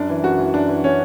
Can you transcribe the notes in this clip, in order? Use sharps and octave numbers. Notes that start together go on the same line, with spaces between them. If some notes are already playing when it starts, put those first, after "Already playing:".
Already playing: F#2 D4
E3
F#2 F#4
E3
F#2 D4
E3
C#4